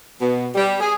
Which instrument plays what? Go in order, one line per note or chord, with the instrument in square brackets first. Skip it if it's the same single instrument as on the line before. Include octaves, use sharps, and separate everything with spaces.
[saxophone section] B2
G3
G#4